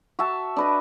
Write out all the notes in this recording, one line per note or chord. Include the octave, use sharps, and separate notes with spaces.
F#4 E5 A5
D4 B4 D#5